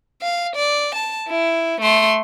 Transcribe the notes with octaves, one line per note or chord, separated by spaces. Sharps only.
F5
D5
A5
E4
A3 C6